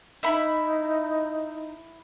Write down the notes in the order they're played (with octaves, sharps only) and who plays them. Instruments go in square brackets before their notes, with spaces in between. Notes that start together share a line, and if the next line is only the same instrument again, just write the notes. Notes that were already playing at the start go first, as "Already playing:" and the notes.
[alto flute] D#4 [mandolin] E4 E5 B5